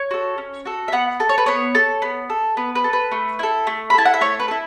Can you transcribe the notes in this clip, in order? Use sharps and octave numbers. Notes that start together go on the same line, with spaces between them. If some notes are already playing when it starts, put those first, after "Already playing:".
Already playing: C#5
F#4 A4
C#4
F#4 A4
E5
B3 F#5
A4
C#5
B4
B3 C#5
A4
B3
A4
B3 B4
B4
A4
B4
A3
E4 A4
A3
B5
E4 A4 A5
F#5
E5
A3 C#5
B4
E4 A4